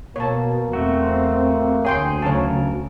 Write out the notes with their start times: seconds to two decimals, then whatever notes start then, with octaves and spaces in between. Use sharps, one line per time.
0.16 B2 A#3 C#5 A5
0.73 E2 A3 C4 F#4
1.85 D2 G#4 C#5 G5 C6
2.22 C#3 F#3 A#4 C#5 A5